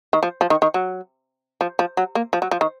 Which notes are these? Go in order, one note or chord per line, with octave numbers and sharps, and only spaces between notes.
D#3
F3
F3
D#3
D#3
F#3
F3
F3
F#3
A#3
F3
F#3
F3
D#3